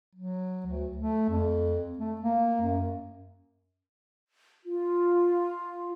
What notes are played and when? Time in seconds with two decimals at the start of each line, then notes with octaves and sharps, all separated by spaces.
0.15 F#3
0.66 D2
0.97 A3
1.29 F2
1.98 A3
2.21 A#3
2.61 F#2
4.65 F4